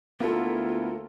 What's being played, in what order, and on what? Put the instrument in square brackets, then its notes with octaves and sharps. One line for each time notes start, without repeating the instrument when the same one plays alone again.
[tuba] D2 [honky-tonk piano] A#3 A4 [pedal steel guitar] B3 E4 [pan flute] F4